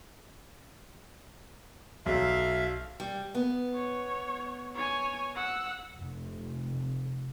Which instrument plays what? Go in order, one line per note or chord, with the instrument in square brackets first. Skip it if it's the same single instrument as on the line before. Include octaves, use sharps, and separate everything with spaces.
[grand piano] B1 [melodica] E5 F5
[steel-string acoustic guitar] G3
B3
[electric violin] C#5
C#5 G#5
F#5 E6
[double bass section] F1